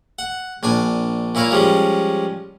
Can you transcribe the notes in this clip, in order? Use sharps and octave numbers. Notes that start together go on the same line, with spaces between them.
F#5
A#1 D4 G#5
A#2 E4 C#5 F5 A#5
F3 G3 G#3 C#4